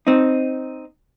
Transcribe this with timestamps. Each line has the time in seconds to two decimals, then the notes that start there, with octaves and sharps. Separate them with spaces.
0.07 C4 D#4